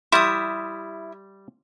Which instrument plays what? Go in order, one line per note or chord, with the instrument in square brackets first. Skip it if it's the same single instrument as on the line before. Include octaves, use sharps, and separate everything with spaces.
[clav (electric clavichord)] G3 E5 [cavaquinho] E4 D#6 [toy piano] C6